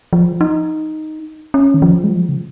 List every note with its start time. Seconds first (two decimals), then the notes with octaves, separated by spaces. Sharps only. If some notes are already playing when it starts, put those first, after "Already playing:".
0.13 F3
0.41 D#4
1.54 C#4
1.74 D#3
1.82 F3
2.04 G#3
2.10 F3
2.29 C#3